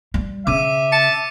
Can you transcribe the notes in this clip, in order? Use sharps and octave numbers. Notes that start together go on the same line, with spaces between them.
G3
C#3 E5 D6 D#7
A5 C#7